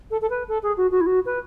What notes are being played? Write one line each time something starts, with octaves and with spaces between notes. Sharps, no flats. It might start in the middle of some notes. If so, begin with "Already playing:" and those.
A4
A4
B4
A4
G#4
F#4
F#4
E4
F#4
B4